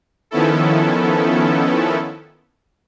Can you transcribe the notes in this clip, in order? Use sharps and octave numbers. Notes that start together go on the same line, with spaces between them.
D#3 F3 B3 C#4 E4 A4